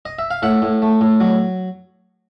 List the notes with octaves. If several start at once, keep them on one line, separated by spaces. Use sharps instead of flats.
D#5
E5
F5
A2 E5 F#5
A2
A3
A2
F#3